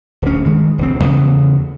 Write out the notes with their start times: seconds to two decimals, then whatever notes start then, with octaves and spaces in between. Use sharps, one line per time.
0.22 D1 C#4
0.44 G2 D#3 G#3
0.78 E1 D2 C4
1.01 E2 C#3 B3